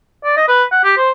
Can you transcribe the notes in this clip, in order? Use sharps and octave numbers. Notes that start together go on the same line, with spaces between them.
D5
D#5
B4
F#5
G4
C5